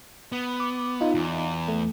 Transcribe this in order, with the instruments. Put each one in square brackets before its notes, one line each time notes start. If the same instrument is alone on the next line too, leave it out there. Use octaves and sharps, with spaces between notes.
[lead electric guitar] B3
[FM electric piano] D6
D#4 F4
[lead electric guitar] E2
[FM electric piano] A3